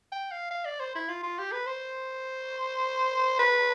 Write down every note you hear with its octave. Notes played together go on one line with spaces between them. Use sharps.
G5
F5
F5
D5
C5
E4
F4
F4
G4
B4
C5
B4